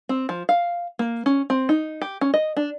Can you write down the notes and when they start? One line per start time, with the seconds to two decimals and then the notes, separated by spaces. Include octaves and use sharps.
0.09 C4
0.29 F3
0.49 F5
0.99 A#3
1.26 C#4
1.50 C4
1.69 D#4
2.02 G4
2.21 C#4
2.34 D#5
2.57 D4